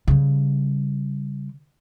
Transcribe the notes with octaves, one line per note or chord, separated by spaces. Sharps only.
C#3 G3